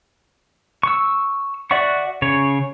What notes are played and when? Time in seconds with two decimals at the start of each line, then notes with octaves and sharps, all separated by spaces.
0.83 C#6 E6
1.71 F#4 D5 E5 F#5 C#6
2.22 C#3 C#5